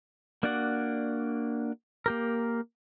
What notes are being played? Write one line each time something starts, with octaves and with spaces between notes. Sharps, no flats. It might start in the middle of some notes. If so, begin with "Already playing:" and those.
A#3 D4 F#4 D5 F#5
A#3 G4 A#4